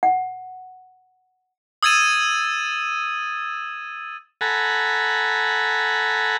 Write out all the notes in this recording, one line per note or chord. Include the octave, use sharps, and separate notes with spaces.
F#5
D#6 E6 G#6 A6 D#7 E7
A4 F#5 G#5 A#5 B5